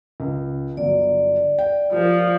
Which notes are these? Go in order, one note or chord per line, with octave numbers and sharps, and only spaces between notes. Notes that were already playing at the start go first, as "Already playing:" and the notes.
C#2
G1 F#3 D5
G5
F3 F4 G4 A#4